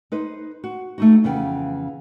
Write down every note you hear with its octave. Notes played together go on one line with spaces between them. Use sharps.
D#4 B4 C5
F#4
A3 D#4 F#4
F2 C#3 E3 B3 G5